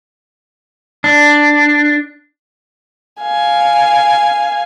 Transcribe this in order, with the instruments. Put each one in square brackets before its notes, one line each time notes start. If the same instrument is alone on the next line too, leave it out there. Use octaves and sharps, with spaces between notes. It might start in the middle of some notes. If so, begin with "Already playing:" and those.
[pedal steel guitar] D4
[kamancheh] F5 G#5